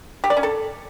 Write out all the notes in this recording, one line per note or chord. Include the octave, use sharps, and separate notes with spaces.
G4
D5
C#4
A4